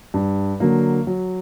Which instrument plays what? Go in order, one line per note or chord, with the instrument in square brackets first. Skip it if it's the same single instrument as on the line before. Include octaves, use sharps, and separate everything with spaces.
[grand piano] G2
D3 F#3 A#3
F#3